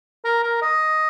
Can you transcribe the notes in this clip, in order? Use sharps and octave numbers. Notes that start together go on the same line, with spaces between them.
A#4
A#4
D#5